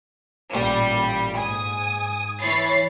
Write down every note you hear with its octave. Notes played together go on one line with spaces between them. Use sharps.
A1 A#2 G3
G#2 G#5 D#6
E3 C#5 B5 A6 C7